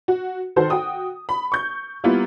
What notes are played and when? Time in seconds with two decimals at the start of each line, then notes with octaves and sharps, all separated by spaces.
0.08 F#4
0.56 D#3 F#4 A4 C5
0.70 F#4 G5 D#6
1.29 B5
1.52 C#6 G6
2.04 G3 A#3 B3 E4 F4